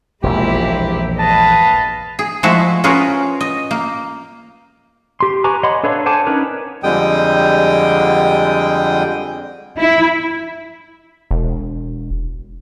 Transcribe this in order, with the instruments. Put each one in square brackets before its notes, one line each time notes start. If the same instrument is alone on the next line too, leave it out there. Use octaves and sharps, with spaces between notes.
[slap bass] E1 A#1 [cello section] A#2 G#3 E4 [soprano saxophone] G4
[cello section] B4 D#5 F5 [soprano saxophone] A5
[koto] G#4
F3 G#3 A3 E4 F#4 E5
C#4 F4 F#4 G#4 A#4 B4
D#5
A#3
[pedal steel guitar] G4 C6
B4 G#5 A#5 C#6 D6
C#5 D#5 F#5 B5 C6
D4 A4 B4 C#5 F5
C5 F#5 G#5 A5 D6
C#4 D#4 A#4 B4 C#5
[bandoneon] F2 D3 G3 G#3 G5 D#6
[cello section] E4
[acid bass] E1